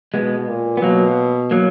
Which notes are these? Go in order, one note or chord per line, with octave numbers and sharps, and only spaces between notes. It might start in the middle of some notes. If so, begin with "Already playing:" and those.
B2 G#3 B3
A#2
B3
B2 F#3 A#3
F#3 A#3